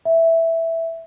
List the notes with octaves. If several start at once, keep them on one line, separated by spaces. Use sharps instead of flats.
E5